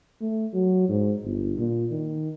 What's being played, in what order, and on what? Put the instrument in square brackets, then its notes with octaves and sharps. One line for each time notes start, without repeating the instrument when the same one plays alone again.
[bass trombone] A3
F#3
G#2
G1
A#2
D#3